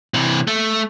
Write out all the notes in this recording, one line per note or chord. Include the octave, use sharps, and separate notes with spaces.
C3 E3
A3